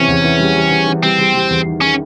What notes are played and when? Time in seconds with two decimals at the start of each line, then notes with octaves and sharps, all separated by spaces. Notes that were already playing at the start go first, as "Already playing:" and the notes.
Already playing: C3 E3 C#4
0.08 E2
0.24 E3
0.40 G3
0.55 G3
0.71 E3
0.87 E3
1.03 G3 C4
1.19 G3
1.35 G3
1.50 E2
1.66 D#3
1.81 D#3 C#4